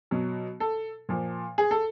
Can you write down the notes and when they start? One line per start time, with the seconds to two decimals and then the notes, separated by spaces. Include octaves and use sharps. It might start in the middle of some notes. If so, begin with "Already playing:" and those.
0.11 B2 F#3
0.60 A4
1.09 A#2 F3
1.58 G#4
1.71 A4